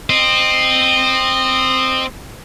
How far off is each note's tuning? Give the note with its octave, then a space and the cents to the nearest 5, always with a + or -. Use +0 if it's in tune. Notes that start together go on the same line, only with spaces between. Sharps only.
C4 +0 D#5 -20